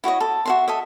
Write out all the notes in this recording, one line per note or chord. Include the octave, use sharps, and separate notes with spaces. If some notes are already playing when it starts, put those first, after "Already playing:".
E4 F#4 C#5 D#5
A4
F#4 E5 C6
A4 D#5 E5